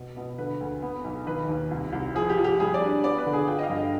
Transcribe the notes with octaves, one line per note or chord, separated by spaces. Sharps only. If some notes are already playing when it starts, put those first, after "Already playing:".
Already playing: B2
B2
D3 B4
D2
B3
B1
D#3 B4
D#2
C2
C2
F3 G#4
G4
F3
G4
G3 G#4
D5
D4
B3 D5
B4
D3
G#4
F4 G5
D#5
F5
G2
D#5